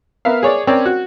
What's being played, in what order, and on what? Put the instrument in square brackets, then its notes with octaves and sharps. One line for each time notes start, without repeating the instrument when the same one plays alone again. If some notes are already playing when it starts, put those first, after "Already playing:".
[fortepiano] B3 A#4 E5 F5
G#4 C#5 D5
C4 C#4 A#4 C#5 D5
F#4